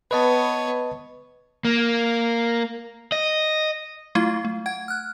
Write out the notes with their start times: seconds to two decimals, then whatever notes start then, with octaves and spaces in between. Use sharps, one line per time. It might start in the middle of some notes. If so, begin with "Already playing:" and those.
0.11 B3 B4 C#5 D#5 A5
1.65 A#3
3.12 D#5
4.15 F#3 A3 E4 F4 G#6
4.45 A3
4.66 F#5 G#6
4.88 F6 F#6